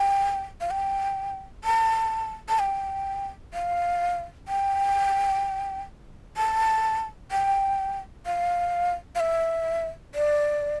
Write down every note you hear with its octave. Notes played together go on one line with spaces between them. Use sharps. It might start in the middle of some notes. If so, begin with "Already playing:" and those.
Already playing: G5
F5
G5
A5
A5
G5
F5
G5
A5
G5
F5
F5
E5
D5